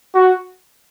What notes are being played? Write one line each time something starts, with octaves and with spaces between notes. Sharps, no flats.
F#4